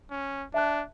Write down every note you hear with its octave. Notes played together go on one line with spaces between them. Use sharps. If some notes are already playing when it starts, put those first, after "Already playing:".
C#4
D4 E5 A5 F#6